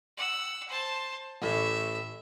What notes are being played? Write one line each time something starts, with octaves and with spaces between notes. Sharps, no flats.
F#5 E6
C5 A5
A1 A2 E5